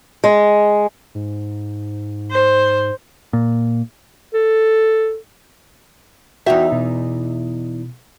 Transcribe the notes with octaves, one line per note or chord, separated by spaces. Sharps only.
G#3
G#2
C5
A#2
A4
E2 D#4 F#4 E5 G5
B2